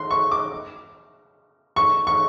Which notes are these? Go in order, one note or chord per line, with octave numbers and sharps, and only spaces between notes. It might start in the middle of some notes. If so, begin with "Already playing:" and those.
Already playing: C6
C#6
D6
C#6
C#6